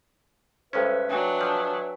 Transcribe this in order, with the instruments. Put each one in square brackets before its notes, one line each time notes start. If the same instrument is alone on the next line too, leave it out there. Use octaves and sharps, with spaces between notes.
[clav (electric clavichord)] G2 G#3 C#4 [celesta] G4 A4 C5 [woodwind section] B4 E5
[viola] F#3 D4 [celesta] G5 G#5
[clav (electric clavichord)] F3